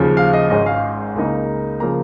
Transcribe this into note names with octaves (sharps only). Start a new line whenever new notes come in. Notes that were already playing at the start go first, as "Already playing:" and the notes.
Already playing: D#2 C#3 F3
F5
D#5
G#1 G#2 G#3 C#4 D#5
F5
C#2 C#3 A#3 D#4
C#3 F3 A#3 A#5